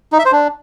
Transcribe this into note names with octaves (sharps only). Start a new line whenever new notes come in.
D#4
E5
C5
D4